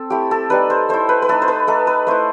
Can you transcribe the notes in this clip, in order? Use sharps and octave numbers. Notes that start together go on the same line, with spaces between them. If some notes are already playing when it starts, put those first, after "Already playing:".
Already playing: C4 A4
A3 E4 G4
A4
G3 D#4 B4
C5
A3 E4 C5
B4
B4
A3 D#4 A4
C5
B4
A3 D#4 A4
B4
A3 E4 C5